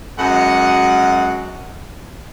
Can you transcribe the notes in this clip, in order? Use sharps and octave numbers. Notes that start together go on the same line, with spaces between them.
F#2 G#3 F#4 F#5